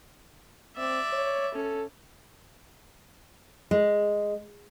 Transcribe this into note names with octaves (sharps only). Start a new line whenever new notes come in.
C4 D5 E5
C#5
C#4 A4
G#3